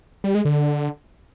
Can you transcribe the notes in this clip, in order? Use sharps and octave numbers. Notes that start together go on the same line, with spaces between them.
G3
G#3
D3